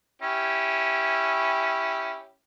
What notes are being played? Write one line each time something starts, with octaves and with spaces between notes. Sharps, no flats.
C#4 E4 G4